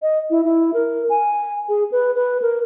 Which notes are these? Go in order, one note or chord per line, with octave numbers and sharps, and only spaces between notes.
D#5
E4
E4
A#4
G#5
G#4
B4
B4
A#4